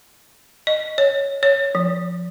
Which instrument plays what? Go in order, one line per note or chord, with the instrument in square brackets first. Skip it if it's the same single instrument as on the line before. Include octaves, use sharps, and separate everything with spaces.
[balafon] D#5
C#5
C#5
F3